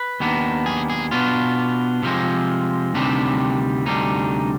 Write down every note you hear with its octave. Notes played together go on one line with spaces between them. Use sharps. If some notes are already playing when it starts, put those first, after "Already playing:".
Already playing: B4
D#2 D#3 B3 D4
G#4
G#4
B2 B3 D4 F4
C3 F3 G#3 C4
D2 C3 D#3 G3 C4 D4
D2 C3 G3 D4 D#4